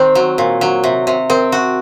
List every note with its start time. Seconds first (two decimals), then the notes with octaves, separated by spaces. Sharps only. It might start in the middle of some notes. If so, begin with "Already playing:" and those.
Already playing: D#3 C4 C5
0.15 F#3
0.38 A#2
0.61 F#3
0.84 C3
1.07 C3
1.30 C4 A#4
1.52 F#4